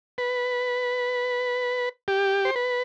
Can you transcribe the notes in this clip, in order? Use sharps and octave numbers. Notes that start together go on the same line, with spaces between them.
B4
G4
C5
B4